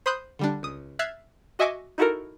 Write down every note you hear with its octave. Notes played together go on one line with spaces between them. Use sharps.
C5 B5 C6 D#6 F#6 G6
D3 G3 D4
C#2 D#6
E5 F6 F#6 G#6 A6 C7
F#4 D#5 E5 G#5 C#6 D6
D#4 E4 F#4 A4 A#4